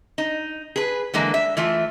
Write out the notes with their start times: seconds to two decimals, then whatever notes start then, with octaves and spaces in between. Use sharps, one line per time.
0.18 D#4
0.76 G#4 B4
1.14 D3 E3 G#3 A#3
1.34 E5
1.57 E3 A3 F4 E5